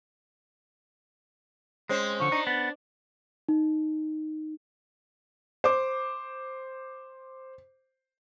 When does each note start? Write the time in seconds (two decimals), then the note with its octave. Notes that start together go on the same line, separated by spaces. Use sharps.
1.89 G#3 C4 C#4 C5
2.20 D3 F3 C#6
2.32 D4 D#4
2.47 B3 A6
3.49 D#4
5.64 C5 D6